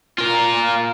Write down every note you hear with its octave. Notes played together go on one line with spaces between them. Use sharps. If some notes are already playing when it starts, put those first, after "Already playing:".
F4 A#4